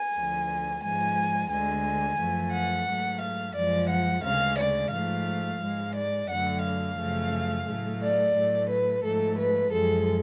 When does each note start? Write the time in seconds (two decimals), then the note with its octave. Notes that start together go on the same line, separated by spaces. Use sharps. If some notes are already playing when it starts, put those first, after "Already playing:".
Already playing: G#5
0.14 D2 D3 F3
0.82 G#2 F3 G#3 G#5
1.50 D2 D3 G#3 G#5
2.19 F#2 F3 A3
2.53 F#5
2.87 G#2 F#3 A3
3.21 F5
3.56 F#2 F3 G#3 D5
3.89 F#5
4.24 D2 C#3 G#3 F5
4.58 D5
4.92 G#2 F3 A3 F5
5.61 G#2 G#3
5.95 D5
6.29 F#2 D3 F#3 A3 F#5
6.63 F5
6.97 F#2 C#3 F3 A3
7.67 A2 F#3 A3
8.00 D5
8.35 A2 F#3 A3
8.69 B4
9.03 G#2 F3 A3 A4
9.37 B4
9.71 F#2 F3 G#3 A4